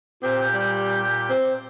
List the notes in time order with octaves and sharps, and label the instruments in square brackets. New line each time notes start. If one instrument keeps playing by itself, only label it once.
[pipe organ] A#2 G4 G6 [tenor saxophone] C4
[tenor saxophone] G3
C4